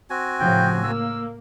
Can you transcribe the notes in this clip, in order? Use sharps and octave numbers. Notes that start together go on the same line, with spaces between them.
C4 F#4 G#5
A2 C#3 F3 G5
A#3 E6